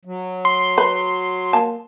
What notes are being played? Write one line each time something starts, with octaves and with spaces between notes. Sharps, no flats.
F#3
C6
B4
A#3 G#5 A5